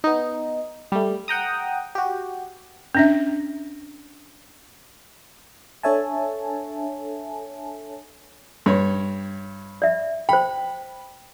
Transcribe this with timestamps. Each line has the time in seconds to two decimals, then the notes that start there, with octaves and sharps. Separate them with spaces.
0.04 B3 D#4
0.92 G3 A3
1.28 F#5 G5 A#5 D#6
1.95 F#4 G4
2.95 C#4 D4 E5
5.83 D4 A4 C#5 E5 G#5 A5
8.66 G2 C#5 C6
9.82 D5 E5
10.29 C5 G5 B5